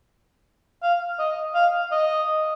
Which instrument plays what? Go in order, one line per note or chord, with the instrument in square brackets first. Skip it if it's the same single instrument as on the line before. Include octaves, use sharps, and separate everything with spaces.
[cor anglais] F5
D#5
F5
D#5